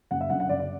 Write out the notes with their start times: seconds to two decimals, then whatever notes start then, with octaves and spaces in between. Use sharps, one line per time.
0.11 F#1 F#5
0.21 E5
0.30 F#2 D3 F#5
0.40 F#5
0.49 F#1 D5
0.59 D5